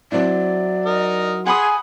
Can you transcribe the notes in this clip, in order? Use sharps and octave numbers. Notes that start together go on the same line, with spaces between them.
F#3 C4 E4 D5
D#4 A#4
G#4 F#5 G#5 B5 C6 D#6